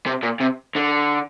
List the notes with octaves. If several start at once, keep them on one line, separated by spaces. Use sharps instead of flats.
C3
A#2
C3
D3